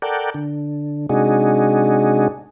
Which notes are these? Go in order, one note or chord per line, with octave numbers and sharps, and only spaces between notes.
A4 A#4 D5 F#5 G5
D3
C3 G#3 D4 D#4 F#4 G#4